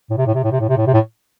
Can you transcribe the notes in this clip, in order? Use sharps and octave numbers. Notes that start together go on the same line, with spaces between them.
A2
C3
A2
C3
A2
C3
A2
C3
A2
C3
A2